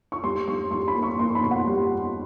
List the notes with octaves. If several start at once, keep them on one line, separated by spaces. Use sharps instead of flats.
C#6
G3 C6
G3 C#6
G3 C6
B5
A#3
C#6
A#3 C6
B5
B2
F#5
G3